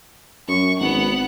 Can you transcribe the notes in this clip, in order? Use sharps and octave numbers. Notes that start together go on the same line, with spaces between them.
F#2 C#6
G#1 B3 F#5